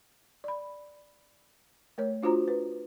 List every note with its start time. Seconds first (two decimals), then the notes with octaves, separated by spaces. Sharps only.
0.44 D5 B5
1.98 A3 A#4 C#5
2.23 D4 F4 F#4 C5 A#5
2.48 B4